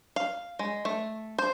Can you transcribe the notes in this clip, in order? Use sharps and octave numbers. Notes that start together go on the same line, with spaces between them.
F5
G#3
A3
C5